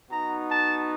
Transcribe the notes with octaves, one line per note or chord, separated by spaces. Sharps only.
B3 D#4 F#4 A#5
A5